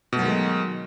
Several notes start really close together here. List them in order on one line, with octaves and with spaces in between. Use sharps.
B2 A3 F#3 D#3 G#3